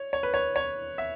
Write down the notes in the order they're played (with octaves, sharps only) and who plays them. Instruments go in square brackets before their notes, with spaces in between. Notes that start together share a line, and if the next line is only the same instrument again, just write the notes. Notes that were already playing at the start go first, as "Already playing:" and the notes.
Already playing: [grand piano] C#5
C#5
B4
C#5
C#5
E5